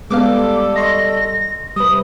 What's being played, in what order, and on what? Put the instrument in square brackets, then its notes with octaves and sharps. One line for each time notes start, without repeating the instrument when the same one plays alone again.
[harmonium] G3 A4 [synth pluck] G#3 B3 F5 [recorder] D6
[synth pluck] D#5 C6 C#6 [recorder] A#6
[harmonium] C3 [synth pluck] G3 B4 [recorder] D#6